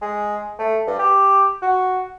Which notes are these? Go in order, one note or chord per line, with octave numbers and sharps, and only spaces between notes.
G#3
A3
G2
G4
F#4